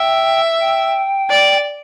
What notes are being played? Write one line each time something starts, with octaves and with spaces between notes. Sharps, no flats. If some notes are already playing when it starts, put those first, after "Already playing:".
Already playing: E5 G5
G5
D5